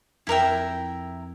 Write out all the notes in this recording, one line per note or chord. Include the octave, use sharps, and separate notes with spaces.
F2 E4 A#4 E5 G5